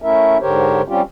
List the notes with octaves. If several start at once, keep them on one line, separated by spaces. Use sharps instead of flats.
A3 C#4 E4 A#4 E5
G#2 D3 G4 A#4 C5 C#5
G3 C4 C#4 F4 G4